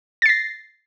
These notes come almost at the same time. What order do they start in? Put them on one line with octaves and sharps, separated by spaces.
A6 C7 A#6